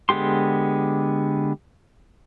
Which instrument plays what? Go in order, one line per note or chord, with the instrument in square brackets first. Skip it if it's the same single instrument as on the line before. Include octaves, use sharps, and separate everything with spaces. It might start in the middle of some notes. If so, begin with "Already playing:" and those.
[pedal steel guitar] D3 G#3 B3 G4 C6